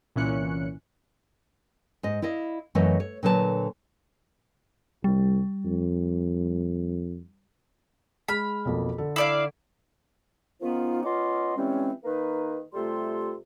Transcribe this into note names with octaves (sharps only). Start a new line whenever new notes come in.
C2 A#2 E3 C#4 F#6 C#7
G#2 D#5
E4 D5 D#5 F5
F#2 E3 A3 C#5 D#5 F#5
C#5
A#2 D3 F#3 B4 C5 A5
C2 G3
F2
G#3 B5 F6
B1 F2 A#3
D3 A4
E4 D5 F5
D#3 F3 B3 C#4 D#4 F4
B3 C#4 F4 D#5 C6 D6
E3 G3 G#3 C4 C#4
D#3 A#3 D#4 B4
C3 G3 A3 F4 A4 C6